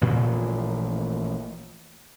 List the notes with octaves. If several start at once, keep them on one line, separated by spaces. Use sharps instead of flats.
A1 A#2 E3 F3